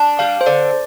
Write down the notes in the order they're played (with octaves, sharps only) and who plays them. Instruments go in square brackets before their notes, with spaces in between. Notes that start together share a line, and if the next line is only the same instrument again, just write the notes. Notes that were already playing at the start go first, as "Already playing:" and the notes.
Already playing: [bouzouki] D4
[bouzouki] G3 [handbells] F5
[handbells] C5
[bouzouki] D3 [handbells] D5